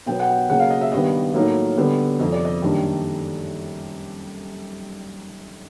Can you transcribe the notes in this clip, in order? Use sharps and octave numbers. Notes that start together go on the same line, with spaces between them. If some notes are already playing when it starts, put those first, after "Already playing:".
B2 F#3 B3 G5
F#5
G5
C#3 F#3 A#3 F#5
F5
D#5
E5
G2 D#3 G3 B3 D#5
A2 F#3 A#3 D#4
D3 G3 B3
F2 C3 F3 D#5
D5
D#5
F#2 D#3 G3 A#3 D4